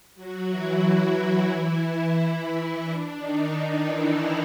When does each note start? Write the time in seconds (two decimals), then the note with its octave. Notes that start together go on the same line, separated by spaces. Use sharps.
0.15 F#3 F#4
0.49 E3 E4
0.82 E3 E4
1.15 E3 E4
2.82 D4
3.17 D#3 D#4
3.49 D#3 D#4
3.83 E3 E4